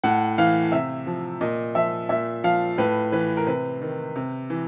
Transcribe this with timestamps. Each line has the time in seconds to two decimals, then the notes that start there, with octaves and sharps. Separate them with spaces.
0.04 A2 F#5
0.38 E3 F5
0.72 C3 E5
1.07 F3
1.41 A#2 D#5
1.75 F3 E5
2.09 A#2 E5
2.44 F3 F5
2.78 A2 B4
3.12 E3 B4
3.37 A#4
3.47 C3 B4
3.81 D#3
4.16 C3
4.50 E3